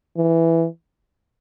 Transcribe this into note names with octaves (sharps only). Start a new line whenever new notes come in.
E3